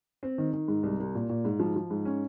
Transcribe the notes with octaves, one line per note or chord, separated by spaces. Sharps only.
C4
D#3
D#3
G#2
C2
C2
A#2
A#2
G#2
F3
F3
G#2
C#4